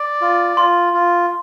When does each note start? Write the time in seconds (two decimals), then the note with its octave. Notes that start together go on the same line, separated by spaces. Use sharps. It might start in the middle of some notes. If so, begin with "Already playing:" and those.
Already playing: D5
0.21 F4
0.57 F4 C6
0.93 F4